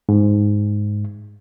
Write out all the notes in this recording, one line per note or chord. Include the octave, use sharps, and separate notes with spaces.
G#2